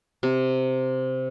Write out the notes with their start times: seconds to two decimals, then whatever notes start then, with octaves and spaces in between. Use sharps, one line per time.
0.23 C3